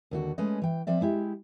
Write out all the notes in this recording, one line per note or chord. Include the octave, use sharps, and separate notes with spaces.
D#2 D3 F#4
G#3 A3 C#4 B4 D#5
E3 G5
F3 C4 D5 E5
G#3 E4 G4